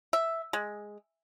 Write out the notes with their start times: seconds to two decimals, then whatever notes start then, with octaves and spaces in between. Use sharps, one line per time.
0.13 E5
0.53 G#3